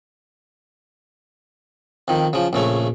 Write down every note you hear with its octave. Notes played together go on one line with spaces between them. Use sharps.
F2 D#3
C#3 F3
A#1 C#3 A3 C#5